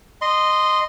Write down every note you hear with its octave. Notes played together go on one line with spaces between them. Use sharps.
D#5 C6